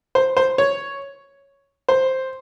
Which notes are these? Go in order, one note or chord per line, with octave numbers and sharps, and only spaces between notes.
C5
C5
C#5
C5